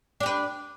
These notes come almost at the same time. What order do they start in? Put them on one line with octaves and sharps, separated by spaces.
D4 G4 B4